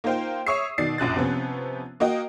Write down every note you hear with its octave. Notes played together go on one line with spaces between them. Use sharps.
A#3 D#4 F4 C5 F5 G5
C#5 E5 C#6 D#6 E6 C7
B2 D#3 D5 A6 C7
A#1 F#2 F#6 A6
C3 F3 B3 C#4
A#3 F#4 D#5 G5